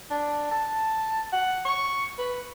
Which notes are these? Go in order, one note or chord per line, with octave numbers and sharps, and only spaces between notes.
D4
A5
F#5
C#6
B4